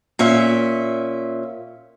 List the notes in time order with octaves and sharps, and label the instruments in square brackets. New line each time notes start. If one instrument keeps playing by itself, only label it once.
[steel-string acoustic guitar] A#2 C#4 E5